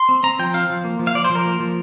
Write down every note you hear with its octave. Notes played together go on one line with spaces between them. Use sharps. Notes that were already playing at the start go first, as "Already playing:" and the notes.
Already playing: C6
C4
C4 A#5
F3 G5
C4 F5
F3
A#3
F3
F5
F3 D5
C5
F3
A#4
A#3
F3